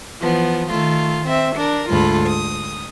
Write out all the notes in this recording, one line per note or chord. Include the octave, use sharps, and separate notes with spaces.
E3 F3 B3
D#3 A3 F4
C4 E5
D4 A#4
D2 G#2 F4 A4 B5
D#6